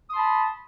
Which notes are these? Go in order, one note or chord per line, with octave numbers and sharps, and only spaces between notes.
A5 B5 C6 D#6